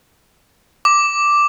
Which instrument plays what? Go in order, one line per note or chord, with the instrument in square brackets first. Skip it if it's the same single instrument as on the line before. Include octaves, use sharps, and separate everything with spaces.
[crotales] D6